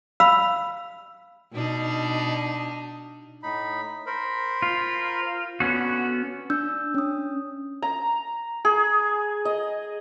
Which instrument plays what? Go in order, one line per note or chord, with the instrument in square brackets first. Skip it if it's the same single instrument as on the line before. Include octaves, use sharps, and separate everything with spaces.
[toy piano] F5 B5 E6
[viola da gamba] B2 D4 D#4
[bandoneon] A2 D#4 B5
A#4 C5 B5
[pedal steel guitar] F4
[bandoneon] D3 [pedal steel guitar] B3 C#4 F#4
[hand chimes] D4 E6 G6
C#4 D#6
[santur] A#5
G#4
D#5